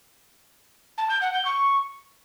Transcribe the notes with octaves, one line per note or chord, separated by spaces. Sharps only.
A5
G6
F#5
G6
C#6